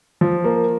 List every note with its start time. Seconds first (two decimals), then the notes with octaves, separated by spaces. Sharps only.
0.21 F3
0.44 A#3